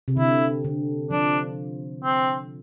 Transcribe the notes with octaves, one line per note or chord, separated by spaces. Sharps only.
C3
D3 E4
D3
F3 D4
C4